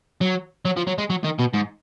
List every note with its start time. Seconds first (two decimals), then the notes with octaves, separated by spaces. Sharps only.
0.21 F#3
0.65 F#3
0.77 F3
0.87 F#3
0.98 G#3
1.10 F#3
1.24 D#3
1.39 B2
1.53 G#2